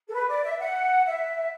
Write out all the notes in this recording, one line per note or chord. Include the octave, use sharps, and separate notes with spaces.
A4
B4
D5
E5
F#5
E5